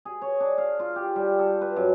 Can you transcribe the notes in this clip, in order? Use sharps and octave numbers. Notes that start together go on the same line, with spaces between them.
G#4
C#5
D4
F5
F4
G4
G3
A4
B4
F#2